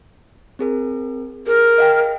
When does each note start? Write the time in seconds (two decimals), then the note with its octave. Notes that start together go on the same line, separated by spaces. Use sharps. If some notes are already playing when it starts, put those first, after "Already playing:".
0.59 C4 G#4 A#4
1.47 G#4 A#4
1.78 D#5 F5 G5